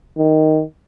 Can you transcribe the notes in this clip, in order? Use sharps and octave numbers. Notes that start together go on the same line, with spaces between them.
D#3